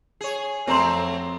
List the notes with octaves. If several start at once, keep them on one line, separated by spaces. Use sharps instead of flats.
G#4 C#5
F2 F#3 A3 C4 A#5 C6